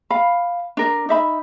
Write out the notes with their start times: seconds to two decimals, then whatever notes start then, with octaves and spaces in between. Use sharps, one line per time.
0.10 F5 B5
0.77 D4 A#4
1.09 D#4 E5 B5